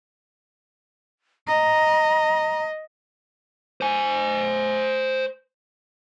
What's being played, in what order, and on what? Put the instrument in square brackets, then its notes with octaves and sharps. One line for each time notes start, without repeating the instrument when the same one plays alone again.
[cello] D#5 [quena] A#5
[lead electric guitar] C5 G#5